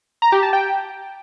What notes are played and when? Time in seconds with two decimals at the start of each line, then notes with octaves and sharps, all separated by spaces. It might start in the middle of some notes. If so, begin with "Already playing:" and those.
0.22 A#5
0.32 G4
0.43 A5
0.53 G5